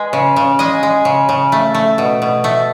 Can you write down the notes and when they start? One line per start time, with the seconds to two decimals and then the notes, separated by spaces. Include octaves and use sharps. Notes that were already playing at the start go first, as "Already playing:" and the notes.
Already playing: G#3 B4
0.13 C#3
0.36 C#3
0.59 G#3 D#5
0.83 G#3
1.05 C#3
1.29 C#3
1.52 A3
1.75 A3
1.98 B2
2.22 B2
2.44 A3